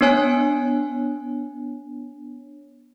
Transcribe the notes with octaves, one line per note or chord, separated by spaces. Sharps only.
B3 D4 C#5 G#5 F#6